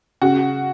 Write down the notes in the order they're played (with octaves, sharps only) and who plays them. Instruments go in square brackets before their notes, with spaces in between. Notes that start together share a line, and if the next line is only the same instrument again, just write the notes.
[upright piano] C#3 [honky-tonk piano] F#4